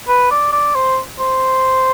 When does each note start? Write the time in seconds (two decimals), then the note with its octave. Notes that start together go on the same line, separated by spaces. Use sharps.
0.08 B4
0.31 D5
0.53 D5
0.76 C5
1.20 C5